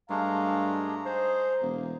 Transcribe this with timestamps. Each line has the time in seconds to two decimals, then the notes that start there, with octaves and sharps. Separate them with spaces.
0.10 G2 G#3 A3 D4 F5 A#5
1.06 D#4 G#4 C5
1.62 E1 A#3